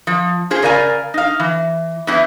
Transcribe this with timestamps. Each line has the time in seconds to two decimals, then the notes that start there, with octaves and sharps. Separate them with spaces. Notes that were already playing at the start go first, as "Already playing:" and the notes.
0.07 F3
0.51 F4 G#4 C5
0.62 C#3 A#4 D5 F5 G#5
1.14 D#4 F5
1.40 E3
2.07 E2 E3